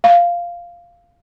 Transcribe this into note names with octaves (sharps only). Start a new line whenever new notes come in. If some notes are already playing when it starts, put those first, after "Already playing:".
F5